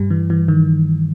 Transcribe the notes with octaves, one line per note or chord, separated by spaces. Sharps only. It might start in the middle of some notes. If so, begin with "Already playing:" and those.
Already playing: G2 G3
E3
E3
D#3